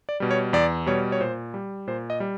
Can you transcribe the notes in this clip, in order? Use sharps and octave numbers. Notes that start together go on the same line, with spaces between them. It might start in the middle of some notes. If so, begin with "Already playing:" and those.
D5
B2 G3
C#5
E2 D5
B2 G3 C#5
C#5
A#2 C5
G3
A#2 C5
D#5
G3